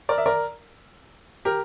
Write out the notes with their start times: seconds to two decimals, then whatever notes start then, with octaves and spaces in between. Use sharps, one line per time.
0.09 A#4 D5
0.18 E5
0.26 A#4 D5
1.45 G4 A#4